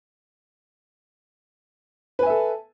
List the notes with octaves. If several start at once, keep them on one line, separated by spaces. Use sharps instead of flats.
A4 B4 E5 G#5